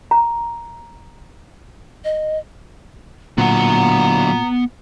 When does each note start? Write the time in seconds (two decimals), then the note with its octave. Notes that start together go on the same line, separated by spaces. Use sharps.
0.11 A#5
2.04 D#5
3.38 A#2 D3 F#3 B3 F#5 A#5